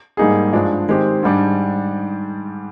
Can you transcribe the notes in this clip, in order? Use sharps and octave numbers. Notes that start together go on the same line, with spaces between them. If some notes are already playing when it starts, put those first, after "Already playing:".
G#2 G3 A#3 D#4 G#4
G2 F3 G#3 D4
D#3 G#3 C4 G4
G#2 G3 D4